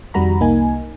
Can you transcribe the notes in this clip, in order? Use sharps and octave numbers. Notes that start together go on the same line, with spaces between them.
F2 D#3 G3 F#4 A#5 B5
C2 A#3 D#4 G#5